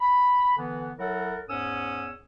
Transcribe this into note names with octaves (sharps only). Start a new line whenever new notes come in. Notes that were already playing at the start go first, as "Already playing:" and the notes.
B5
D3 E3 B3
F#3 E4 A4 A#4 C#5 F#5
E2 G#2 C#4 C#5 D#6 E6